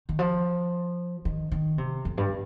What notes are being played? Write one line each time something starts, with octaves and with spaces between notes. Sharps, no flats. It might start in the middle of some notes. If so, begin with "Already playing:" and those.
D#3
F3
D#3
D#3
C3
F2
G2